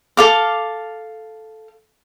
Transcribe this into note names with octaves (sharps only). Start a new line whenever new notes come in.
A4 F5 D6